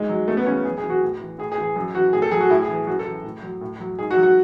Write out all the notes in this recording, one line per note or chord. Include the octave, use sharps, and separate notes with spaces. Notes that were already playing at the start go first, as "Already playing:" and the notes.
Already playing: G#2 G#3
F#3
F#2 A3
B3
C#3 E3 C#4
F#2 G#4
G#4
E3
F#4
A2
E3
A2 G#4
G#4
E3
G#4
F#2 G#4
E3 F#4
A2 G#4
A4
F#3 G#4
F#4
A2 E4
G#4
E3
G#4
F#2 F#4
A4
E3
A2
F#3
A2
F#3
G#2 G#4
F#4
F#3
F#4